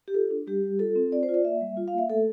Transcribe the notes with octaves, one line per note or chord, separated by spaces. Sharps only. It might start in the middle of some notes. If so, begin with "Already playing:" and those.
G4
F4 A4
D4
G3 G4
G3
F4 A4
C4
F4 D5
C5
F4
D5
A#3 E5
G3
F4
F5
A#3 E5
A3 A4